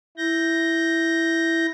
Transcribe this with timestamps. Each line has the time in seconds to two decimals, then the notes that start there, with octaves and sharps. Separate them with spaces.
0.18 E4 G6 A#6